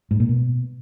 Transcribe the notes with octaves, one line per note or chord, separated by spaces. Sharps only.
G#2
A#2
B2